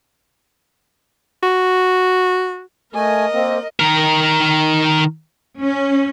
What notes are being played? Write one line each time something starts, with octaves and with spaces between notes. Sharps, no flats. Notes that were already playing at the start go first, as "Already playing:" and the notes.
F#4
A3 A#4 D#5 G#5
A#3 C4
D#3 A#4
C#4